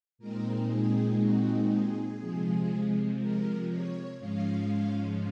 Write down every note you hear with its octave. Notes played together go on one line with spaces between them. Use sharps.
A#2 G#3 C4 D#4 A#4
G#4
F#4
G#4
C3 F3 G#3
A#4
C#5
G#2 F3 G#3 C#4 F5